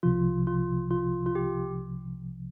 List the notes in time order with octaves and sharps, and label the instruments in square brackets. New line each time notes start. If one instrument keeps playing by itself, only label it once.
[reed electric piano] C2 C3 F3 [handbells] F4
[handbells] F4
F4
F4
G4